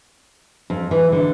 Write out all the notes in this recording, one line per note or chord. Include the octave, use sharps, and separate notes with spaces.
F2
E3
D3